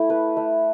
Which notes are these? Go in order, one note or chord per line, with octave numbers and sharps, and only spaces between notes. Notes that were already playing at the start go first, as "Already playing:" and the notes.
Already playing: A3 E4
B4
A3